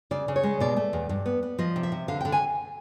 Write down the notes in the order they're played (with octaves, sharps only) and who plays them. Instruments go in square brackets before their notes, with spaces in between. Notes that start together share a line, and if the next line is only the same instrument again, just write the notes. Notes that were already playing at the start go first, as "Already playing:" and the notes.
[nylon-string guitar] C#3 D5
C#3
C#5
G#3
B2 D5
A3
E2
G2
B3
B3
F3 D#5
C3
E5
C3
D3 F5
D3 G5
G#5